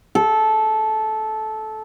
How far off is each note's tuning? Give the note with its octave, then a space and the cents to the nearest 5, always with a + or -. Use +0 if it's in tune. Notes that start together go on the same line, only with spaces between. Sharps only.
A4 -15